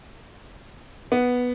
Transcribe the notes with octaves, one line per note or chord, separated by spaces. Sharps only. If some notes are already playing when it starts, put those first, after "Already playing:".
B3